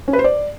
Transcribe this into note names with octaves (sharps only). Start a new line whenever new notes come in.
C#4
B4
C5
D5